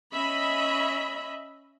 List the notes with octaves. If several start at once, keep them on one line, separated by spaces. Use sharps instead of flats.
C#4 D#5 E5 B5